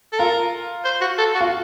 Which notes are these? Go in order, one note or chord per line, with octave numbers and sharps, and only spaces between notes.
A4
F4 A#4
C5
F#4
A4
F#4
F4